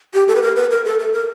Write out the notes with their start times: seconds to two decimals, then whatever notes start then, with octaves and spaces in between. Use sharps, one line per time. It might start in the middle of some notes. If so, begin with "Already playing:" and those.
0.14 G4
0.28 A4
0.35 B4
0.42 A#4
0.56 B4
0.71 A#4
0.85 A4
0.99 A4
1.13 A#4